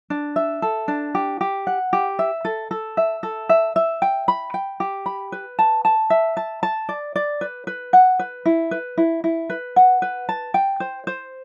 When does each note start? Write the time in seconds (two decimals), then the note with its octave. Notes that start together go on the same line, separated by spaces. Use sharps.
0.10 D4
0.36 E5
0.62 A4
0.88 D4
1.15 G4
1.41 G4
1.67 F#5
1.93 G4
2.19 E5
2.45 A4
2.71 A4
2.97 E5
3.23 A4
3.49 E5
3.76 E5
4.02 G5
4.28 B5
4.54 G5
4.80 G4
5.06 B5
5.32 B4
5.59 A5
5.85 A5
6.10 E5
6.37 A5
6.63 A5
6.89 D5
7.16 D5
7.41 B4
7.67 B4
7.93 F#5
8.19 B4
8.46 E4
8.71 B4
8.97 E4
9.24 E4
9.50 B4
9.76 F#5
10.02 B4
10.29 A5
10.54 G5
10.80 C5
11.07 C5